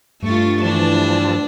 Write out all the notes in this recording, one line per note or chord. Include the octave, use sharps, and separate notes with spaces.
G2 A3 F4 C#6 A6
E3 F3 D4 A5